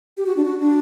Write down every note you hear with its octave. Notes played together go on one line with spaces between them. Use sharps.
G4
F#4
D4
F#4
D4